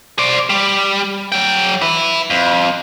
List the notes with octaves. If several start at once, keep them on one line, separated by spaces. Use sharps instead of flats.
C5 D5
G3
F#3 G5
E4 B4
F2